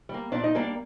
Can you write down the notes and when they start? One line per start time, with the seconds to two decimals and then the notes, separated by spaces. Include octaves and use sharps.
0.09 G3 A#3
0.32 A#2 D4 D5
0.44 D#4 D#5
0.55 G3 A#3 D4 D5